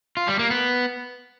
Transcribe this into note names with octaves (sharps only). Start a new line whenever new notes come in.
F4
G3
A#3
B3